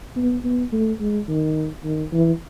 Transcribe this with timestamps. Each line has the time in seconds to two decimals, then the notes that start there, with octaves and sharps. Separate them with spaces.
0.16 B3
0.44 B3
0.72 A3
1.00 G#3
1.28 D#3
1.84 D#3
2.13 E3